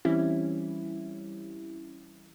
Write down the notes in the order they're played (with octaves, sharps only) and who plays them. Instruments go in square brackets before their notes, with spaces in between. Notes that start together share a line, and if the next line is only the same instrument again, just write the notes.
[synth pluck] E3 G3 C4 C#4 E4